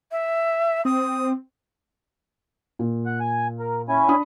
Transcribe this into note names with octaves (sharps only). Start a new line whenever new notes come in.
E5
C4 D#6
A#2
F#5
G#5
A#4
C#4 E4 G#5
D4 B5 D#6